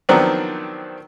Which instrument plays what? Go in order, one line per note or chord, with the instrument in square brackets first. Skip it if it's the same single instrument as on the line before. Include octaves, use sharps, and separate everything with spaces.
[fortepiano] D#3 F3 F#3 B3 C4 D4